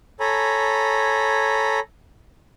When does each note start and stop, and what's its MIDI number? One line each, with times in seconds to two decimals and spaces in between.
0.20 1.80 69
0.20 1.80 73
0.20 1.80 80
0.20 1.80 82
0.20 1.80 83